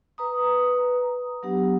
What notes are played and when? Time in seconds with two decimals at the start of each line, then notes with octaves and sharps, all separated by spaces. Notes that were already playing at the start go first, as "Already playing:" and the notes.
0.18 B4 A#5 D#6
1.43 F#3 B3 D4 G4 F#5